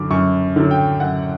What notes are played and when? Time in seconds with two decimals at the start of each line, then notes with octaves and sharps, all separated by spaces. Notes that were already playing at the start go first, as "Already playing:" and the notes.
Already playing: F#2 D3 F#3 D6
0.11 F#2 C#6
0.56 D3 F#3
0.71 G5
1.00 F#2 F#5